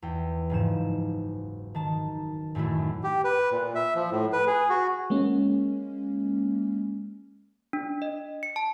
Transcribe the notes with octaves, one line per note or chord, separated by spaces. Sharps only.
E2 G5
F#1 G#2 F3 E7
D#3 A5
F#2 A2 D#3 A3 E4
G4
B4
A#2
E5
F3
A2
B4
G#4
F#4
G#3 A#3 C#4
D4
D#5
C#7
A5